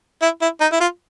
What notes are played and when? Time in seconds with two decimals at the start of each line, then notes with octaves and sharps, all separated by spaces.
0.22 E4
0.42 E4
0.61 D#4
0.72 E4
0.80 F4